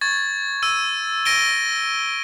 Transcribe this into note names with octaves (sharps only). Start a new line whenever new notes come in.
C#6 G#6 A6
E6 D#7
A#6 D7 D#7 G7